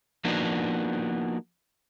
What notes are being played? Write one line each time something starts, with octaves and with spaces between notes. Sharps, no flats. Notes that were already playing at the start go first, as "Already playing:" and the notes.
F3 A#3 B3 D4 D#4 F#4